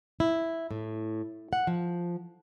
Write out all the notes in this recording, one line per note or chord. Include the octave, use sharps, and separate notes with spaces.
E4
A2
F#5
F3